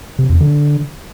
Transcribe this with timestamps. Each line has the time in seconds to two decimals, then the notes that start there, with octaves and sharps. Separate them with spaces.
0.19 C3
0.30 E2
0.41 D3